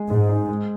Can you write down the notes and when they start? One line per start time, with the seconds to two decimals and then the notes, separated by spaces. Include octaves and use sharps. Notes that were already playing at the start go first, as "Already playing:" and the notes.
Already playing: G#3 G#4
0.10 G#2 G#3
0.29 D#4
0.49 G#3